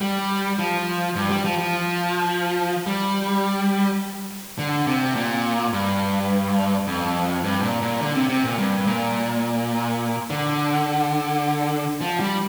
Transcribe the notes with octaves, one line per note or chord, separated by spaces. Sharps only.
G3
F3
G2
G3
F3
F3
G3
D3
C3
A#2
G2
F2
G2
A#2
A#2
D3
C3
C3
A#2
G2
A#2
D3
F3
G3